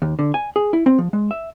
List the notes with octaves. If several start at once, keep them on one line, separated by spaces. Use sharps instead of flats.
D#2
D3
G#5
G#4
E4
C4
F3
G#3
E5